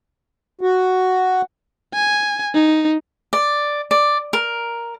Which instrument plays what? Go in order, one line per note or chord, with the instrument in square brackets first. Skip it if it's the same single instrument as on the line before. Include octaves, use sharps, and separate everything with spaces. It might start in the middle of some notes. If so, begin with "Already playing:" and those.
[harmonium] F#4
[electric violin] G#5
D#4
[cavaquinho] D5
D5
A#4